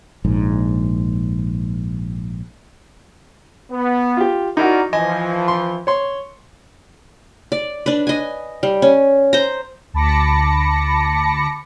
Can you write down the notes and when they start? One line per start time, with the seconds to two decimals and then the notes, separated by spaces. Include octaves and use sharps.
0.25 A#1 G#2
3.72 B3
4.17 F4 G4
4.57 D#4 E4 F#4 A#4 D5
4.93 E3 F3 D#5 G#5
5.48 C6
5.87 C#5 C6
7.52 D5
7.86 D4 B4
8.07 D#5 G#5
8.63 G3
8.82 C#4
9.33 C5 A#5
9.94 D2 A5 B5 D6 A#6 C#7